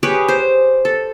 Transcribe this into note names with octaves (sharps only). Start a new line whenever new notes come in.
G4 G#4 B4 C#5
C5
A4